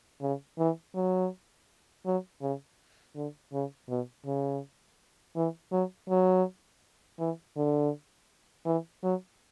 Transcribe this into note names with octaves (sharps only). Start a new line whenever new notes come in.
C#3
E3
F#3
F#3
C#3
D3
C#3
B2
C#3
E3
F#3
F#3
E3
D3
E3
F#3